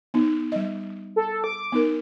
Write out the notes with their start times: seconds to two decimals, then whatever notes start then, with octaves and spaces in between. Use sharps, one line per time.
0.14 B3 D#4
0.52 G3 D#5
1.16 A4
1.44 D6
1.72 B3 D#4 A#4